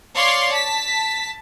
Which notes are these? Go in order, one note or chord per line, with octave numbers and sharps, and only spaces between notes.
C#5 D5 F5 C6
A5 B6